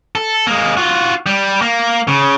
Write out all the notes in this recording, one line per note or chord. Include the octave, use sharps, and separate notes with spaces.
A4
G#3 A#3
F4 F#4
G3
A#3
C#3